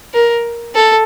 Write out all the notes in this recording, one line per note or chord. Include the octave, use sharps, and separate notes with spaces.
A#4
A4